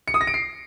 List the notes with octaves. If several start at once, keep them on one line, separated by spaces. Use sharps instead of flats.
C#7
D#6
A#6
D7
C7